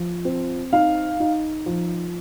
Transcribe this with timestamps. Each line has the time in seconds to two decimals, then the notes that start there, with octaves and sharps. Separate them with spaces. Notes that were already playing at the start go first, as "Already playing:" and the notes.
Already playing: F3
0.25 C4
0.73 D#4 F5
1.20 D#4
1.66 F3